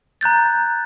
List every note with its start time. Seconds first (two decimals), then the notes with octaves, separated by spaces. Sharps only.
0.21 A#5 F#6 G6 A6